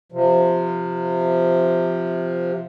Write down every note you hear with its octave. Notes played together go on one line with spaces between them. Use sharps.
C3 F3